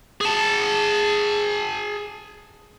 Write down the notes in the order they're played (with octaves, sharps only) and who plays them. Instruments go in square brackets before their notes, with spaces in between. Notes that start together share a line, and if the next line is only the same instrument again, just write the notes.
[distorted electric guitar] G#4 A5